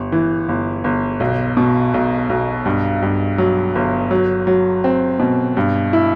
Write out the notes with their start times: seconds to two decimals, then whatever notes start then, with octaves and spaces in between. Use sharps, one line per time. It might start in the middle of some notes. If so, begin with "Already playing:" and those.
Already playing: G1
0.12 E3
0.49 G1
0.84 G1
1.20 B1
1.57 B2
1.94 B1
2.29 B1
2.65 G2
3.02 G2
3.38 F#3
3.75 G1
4.11 F#3
4.47 F#3
4.84 C4
5.19 B2
5.57 G2
5.93 E4